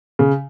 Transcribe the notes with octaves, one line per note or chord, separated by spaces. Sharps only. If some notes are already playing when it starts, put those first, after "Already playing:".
C#3